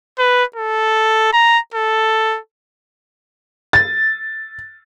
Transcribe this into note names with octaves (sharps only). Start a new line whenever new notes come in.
B4
A4
A#5
A4
A6